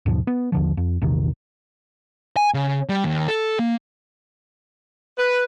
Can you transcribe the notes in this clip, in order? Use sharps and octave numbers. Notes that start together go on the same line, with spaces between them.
D#2 G#2 B2 F3
B3
D#2 D3 F3
F2
A#1 E2 C3 D#3
G#5
C#3
G3
D#2
A4
A#3
B4